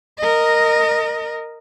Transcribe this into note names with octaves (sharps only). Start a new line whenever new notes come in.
A#4 D#5